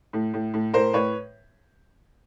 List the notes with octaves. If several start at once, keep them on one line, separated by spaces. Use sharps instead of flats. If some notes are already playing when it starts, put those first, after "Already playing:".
A2
A2
A2
A2 A#4 C5
A2 B4 C#5